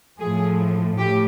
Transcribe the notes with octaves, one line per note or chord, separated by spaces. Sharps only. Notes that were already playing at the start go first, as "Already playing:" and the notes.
A2 F3 G#4
A2 G4